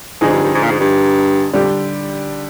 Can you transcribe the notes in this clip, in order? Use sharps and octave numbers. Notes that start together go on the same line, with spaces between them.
G#2 D3 F3 C4 D#4 G#4
G2
G2
G#2
A#2
G#2
G2
F2 D3 G3 D4 G4